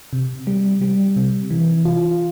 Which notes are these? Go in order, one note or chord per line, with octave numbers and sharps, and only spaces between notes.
C3
G3
G3
C3
E3
F4